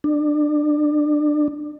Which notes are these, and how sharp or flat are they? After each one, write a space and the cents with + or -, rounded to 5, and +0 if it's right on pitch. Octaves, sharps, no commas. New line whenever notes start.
D4 +25